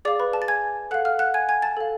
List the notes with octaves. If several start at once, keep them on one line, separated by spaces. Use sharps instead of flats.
G#4 D5 F5 D6
B4 B5
A5
A6
G#5 G#6
A4 F5 F#5 F#6
F5 F6
F#5 F#6
G#5 G#6
G#5 G#6
A5 A6
A4 F5